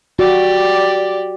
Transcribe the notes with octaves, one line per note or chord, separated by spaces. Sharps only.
F#4 G4 D5